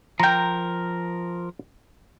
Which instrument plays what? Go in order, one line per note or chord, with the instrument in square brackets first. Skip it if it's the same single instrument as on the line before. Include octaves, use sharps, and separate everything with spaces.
[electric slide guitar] F3 A#4 [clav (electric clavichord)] G5 A#5